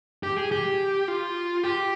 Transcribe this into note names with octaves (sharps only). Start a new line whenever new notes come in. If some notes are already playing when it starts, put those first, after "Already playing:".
G4
G#4
G4
F4
G4